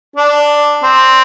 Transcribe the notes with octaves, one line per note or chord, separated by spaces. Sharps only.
D4
C4